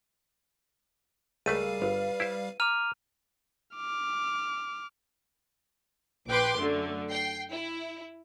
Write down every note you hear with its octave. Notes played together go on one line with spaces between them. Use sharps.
C#2 G3 A3 G#4 A#4 B4 F5 D#7
G1 B4
E4 G4 C5
A#5 D6 F6 D#7 F7
D6 F6
A#1 B4 G5 C6 D6
F#2 D3 A3
G5 C7
E4